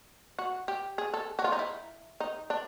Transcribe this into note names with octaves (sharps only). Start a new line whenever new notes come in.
F#4
G4
G#4
A4
F#4
F4
D#4
E4
D#4
D4